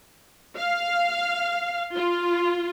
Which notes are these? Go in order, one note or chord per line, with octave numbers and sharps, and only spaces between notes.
F5
F4